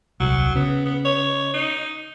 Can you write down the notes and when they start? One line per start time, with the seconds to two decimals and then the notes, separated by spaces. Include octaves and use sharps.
0.20 D#1 C2 F#3
0.55 C#3 B3
0.85 B3
1.05 C#5
1.54 D#4